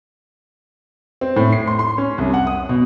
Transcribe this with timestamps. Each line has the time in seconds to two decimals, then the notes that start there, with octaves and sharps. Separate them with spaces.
1.21 C4
1.36 A2
1.52 C7
1.67 C6
1.79 C6
1.98 C#4
2.18 C2
2.34 F#5
2.47 D#6
2.69 B2